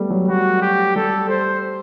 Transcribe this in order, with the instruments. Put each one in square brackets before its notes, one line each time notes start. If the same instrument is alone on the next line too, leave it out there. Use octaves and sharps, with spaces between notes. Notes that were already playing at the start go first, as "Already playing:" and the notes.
Already playing: [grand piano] G3 A3 B3
F#3
[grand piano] G3 [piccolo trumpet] F#4
[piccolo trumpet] G4
[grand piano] G3 [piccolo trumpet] A4
[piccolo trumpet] C5